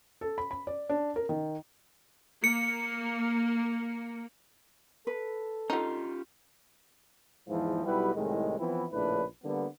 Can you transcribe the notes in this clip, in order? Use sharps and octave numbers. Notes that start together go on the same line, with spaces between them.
A4
B5
B5
D5
D4
A#4
D#3
A#3 C#7
A4 B4
D3 C#4 D#4 F4 G4
E2 G#2 E3 F3
B1 G3 E4 F#4 G4 B4
C2 A2 D#3 G#3
E3 F3 B3 C4 E4
A#1 A2 C#3 D4 E4 B4
D3 G3 A#3 B3